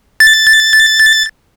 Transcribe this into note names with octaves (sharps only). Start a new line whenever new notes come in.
A6